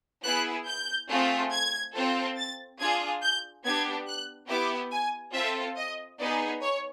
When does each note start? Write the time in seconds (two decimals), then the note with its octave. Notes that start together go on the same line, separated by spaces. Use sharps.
0.25 B3 E4 G#4 F#6
0.67 G6
1.10 A3 C4 F4 G#4
1.53 G#6
1.95 C4 F4 A4
2.37 A6
2.80 D4 F4 G#4 G#6
3.22 G6
3.65 B3 D4 G4 G#6
4.07 F#6
4.49 B3 E4 G4 D6
4.92 G#5
5.34 C4 F4 A4 E5
5.77 D#5
6.19 B3 D#4 G#4 D5
6.62 C#5